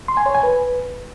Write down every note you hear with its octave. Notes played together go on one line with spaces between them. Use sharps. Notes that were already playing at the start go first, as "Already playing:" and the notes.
C6
G#5
C#5
G#5
B4